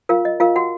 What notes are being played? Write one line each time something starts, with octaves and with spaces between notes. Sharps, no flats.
F4 A#4 F5
D#5
F4 A#4 F5
F#4 F#5